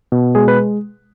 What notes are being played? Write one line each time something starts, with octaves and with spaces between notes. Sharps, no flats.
B2
G#3 G#4
B4